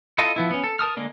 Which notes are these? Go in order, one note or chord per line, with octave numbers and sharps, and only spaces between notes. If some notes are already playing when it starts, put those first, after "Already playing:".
E4 F4 A4 D#5
F3 B3 E4
B3 C#4
A4
A#4 A5 D#6 F6
D3 G#3 A#3 D4